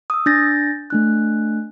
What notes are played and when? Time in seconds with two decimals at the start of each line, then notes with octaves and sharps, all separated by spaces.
0.10 D#6 E6
0.26 D4 G6 A6 A#6
0.90 A3 D4 F#6